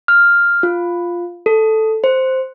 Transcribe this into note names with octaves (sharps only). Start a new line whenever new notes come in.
F6
F4
A4
C5